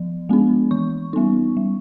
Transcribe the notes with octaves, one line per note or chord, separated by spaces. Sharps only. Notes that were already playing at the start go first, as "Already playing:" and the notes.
Already playing: F3
G#3 B3 D4
E3 C#6
G3 B3 D#4
G3